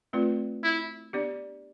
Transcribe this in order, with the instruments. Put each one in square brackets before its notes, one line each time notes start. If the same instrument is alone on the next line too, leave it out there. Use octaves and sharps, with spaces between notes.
[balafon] A3 C4 F4 B4 D5
[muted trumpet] E4
[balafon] B3 D4 G4 D5